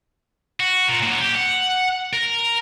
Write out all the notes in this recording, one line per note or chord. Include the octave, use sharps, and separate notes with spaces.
F#4
A#2
A#2 F#3
G4
F#5
A#4